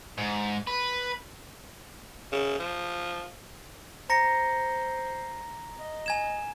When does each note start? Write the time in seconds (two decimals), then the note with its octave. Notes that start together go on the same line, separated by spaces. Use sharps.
0.18 G#2
0.67 B4
2.32 C#3
2.59 F3
4.10 C5 A#5 A#6 C#7
5.80 D#5
6.06 G#5 G#6 E7